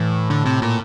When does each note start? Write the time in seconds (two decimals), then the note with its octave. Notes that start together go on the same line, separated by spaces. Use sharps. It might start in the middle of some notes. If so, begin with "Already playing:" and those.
Already playing: A2 E3
0.30 D3
0.45 C3
0.62 A#2